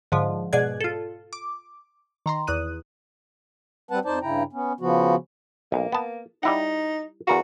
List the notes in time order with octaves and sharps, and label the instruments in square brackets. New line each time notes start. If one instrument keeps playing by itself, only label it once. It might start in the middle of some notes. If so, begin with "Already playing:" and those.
[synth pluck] G#2 D3 F3
G#2 B2 G#4 D5 F#6 G#6
F4 A4
D6
D#3 A#5 C6
E2 D#6 F#6 D#7
[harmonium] G3 C4 B4 F#5 A5
F2 D#4 C5 D5 A5
G2 C#3 E4 G5 A#5
B3 C#4
C#3 F3 B3 F#4
[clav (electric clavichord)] B1 [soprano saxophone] A#3
[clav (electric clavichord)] B3 A5
[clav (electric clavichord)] G3 E4 F#5 [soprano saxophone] D#4
[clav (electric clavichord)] E2 A#4 F5 [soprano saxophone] F#4